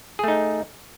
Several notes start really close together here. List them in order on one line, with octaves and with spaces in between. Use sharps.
G#4 A3 D#4